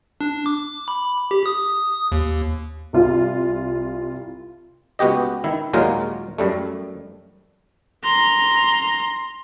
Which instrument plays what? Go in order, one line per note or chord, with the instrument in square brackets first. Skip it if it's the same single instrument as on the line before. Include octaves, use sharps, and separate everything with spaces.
[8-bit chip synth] D4
D6
B5
G4
D#6
D#2
[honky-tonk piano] C2 F4
[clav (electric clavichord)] C#2 B3 F#4 G4 D#5
D#3 E4
D#2 A#2 F#3 G#3 F4 A#4
F#2 G3 A3
[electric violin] A#5 C6